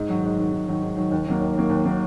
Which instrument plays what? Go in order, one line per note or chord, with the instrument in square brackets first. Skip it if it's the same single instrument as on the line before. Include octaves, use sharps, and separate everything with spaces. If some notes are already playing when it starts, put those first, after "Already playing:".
Already playing: [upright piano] G#2
D#3 F#3
G#2
D#3 F#3
G#2
D#3 F#3
G#2
D#3 F#3
D#2
D#3 F#3 A#3
D#2
D#3 F#3 A#3
D#2
D#3 F#3 A#3